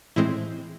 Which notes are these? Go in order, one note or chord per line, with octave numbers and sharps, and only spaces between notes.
A2 E3 G#3 C4